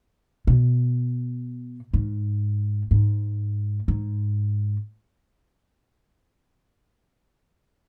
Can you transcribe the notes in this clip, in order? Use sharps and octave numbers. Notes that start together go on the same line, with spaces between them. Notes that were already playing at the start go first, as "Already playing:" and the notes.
B2
G#2
G#2
G#2